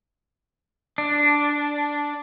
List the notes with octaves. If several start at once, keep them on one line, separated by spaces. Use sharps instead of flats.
D4